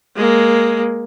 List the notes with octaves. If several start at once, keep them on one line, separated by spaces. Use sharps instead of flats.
G#3 A#3